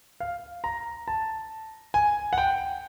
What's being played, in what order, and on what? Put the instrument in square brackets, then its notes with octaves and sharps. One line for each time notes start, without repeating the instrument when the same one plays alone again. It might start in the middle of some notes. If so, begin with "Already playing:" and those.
[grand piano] F5
A#5
A5
G#5
F#5
G5